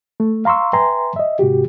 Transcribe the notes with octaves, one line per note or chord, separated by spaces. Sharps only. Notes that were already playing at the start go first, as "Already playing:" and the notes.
A3
F5 A#5 C6 C#6 E6
B4 E5 G5 G#5 A#5 C6
D#5 E5
G#2 C3 F#4 G4